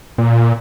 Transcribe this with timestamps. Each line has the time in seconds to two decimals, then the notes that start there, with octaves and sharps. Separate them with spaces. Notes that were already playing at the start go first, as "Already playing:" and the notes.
0.18 A#2